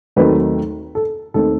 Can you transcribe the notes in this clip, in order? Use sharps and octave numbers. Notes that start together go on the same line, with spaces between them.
D#2 D#3 F#3 A3 C4 B4
A4
D#2 D#3 A3 C4 A4